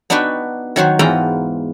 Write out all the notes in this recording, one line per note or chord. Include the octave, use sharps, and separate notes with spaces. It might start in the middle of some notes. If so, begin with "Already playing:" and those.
B3 D4 D#4 F#4 B4 G5
D#3 F#3 F#4 C5
E2 G#2 B3 F4 G5 A#5